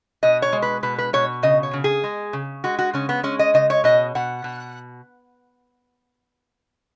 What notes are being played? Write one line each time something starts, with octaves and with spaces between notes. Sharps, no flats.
B2 D#5
C#5
G#3
B4
B2 B4
B4
B2 C#5
C#3 D#5
C#5
C#3
G#4
G#3
C#3
G#3 F#4
F#4
C#3 C#4
B3
G#3 C#4
D#5
C#3 D#5
C#5
B2 D#5
B2 F#5
B2